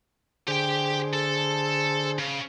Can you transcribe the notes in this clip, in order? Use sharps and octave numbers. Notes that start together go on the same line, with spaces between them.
D3 G4 G#4 C5 G5
A4
C#3